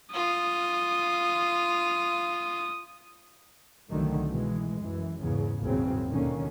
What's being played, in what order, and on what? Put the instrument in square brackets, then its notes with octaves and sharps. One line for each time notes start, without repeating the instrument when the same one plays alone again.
[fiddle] F4 [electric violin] D#6
[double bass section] C2 D3 D#3 F#3 A3
B2 E3 G#3
F#2 E3
E2 G#2 C#3
G#1 E2 A#2 C#3 F#3 C4
D#2 B2 D3 D#3 A#3 C#4